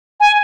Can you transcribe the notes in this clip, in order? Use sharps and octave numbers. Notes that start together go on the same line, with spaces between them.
G#5